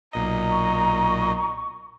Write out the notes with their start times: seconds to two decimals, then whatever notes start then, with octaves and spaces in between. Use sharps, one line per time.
0.13 B1 A#2 D#5 A#5
0.51 C#6